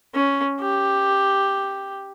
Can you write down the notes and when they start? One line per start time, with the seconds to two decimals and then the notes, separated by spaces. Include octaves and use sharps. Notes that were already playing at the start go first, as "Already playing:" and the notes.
0.15 C#4
0.61 G4